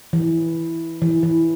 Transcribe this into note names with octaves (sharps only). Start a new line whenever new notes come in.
E3
E3
E3